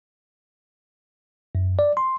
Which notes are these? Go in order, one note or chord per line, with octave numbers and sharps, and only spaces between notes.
F#2
D5
C6